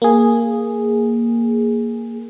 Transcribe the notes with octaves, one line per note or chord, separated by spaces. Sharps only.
A#3 G#4